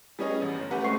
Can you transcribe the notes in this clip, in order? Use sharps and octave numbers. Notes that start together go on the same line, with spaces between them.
G3 B3 C#4 G#4 C#5 D#5
A1
G1
A3 C#4 G4 B4 F#5
G#3 A3 C4 C#6 C7